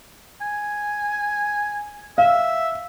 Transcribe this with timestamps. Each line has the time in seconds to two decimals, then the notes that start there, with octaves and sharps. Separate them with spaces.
0.41 G#5
2.18 E5 F5